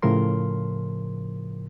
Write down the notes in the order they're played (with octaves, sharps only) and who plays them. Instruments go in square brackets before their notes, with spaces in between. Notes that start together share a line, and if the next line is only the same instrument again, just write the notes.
[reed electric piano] A2 C#3 F3 A#4 C6